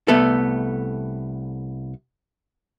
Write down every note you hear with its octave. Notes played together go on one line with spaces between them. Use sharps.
C2 A3 B3 A4